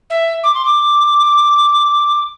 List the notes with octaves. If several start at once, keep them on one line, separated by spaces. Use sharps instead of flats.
E5
D6
C6
D6